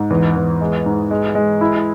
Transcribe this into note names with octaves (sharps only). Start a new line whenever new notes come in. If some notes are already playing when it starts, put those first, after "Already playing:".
Already playing: G#2
E2
E2
G#3
G#2
G#3
G#3
E4